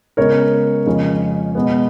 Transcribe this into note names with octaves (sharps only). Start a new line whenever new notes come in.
C#3 G#3 B3 A#4 C#5
F2 C#3 G#3 C#4
B2 G#3 B3